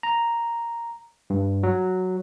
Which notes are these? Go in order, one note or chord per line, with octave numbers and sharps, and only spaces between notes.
A#5
G2
F#3